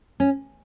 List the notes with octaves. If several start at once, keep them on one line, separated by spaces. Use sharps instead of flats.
C#4